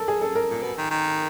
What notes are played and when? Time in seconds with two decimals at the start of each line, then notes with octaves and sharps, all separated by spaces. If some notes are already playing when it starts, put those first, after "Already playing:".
Already playing: A4 A#4
0.08 G#4
0.21 A4
0.35 A#4
0.50 A#2
0.63 B2
0.78 D#3
0.91 D#3